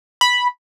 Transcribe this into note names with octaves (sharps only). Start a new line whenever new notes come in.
B5